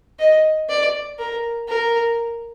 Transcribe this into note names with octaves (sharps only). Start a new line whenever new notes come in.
D#5
D5
A#4
A#4